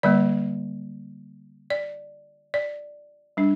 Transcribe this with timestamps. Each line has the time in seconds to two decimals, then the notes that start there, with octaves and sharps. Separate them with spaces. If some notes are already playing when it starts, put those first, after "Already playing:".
0.03 D3 G3 A#3 D5
1.70 D5
2.54 D5
3.37 G3 D4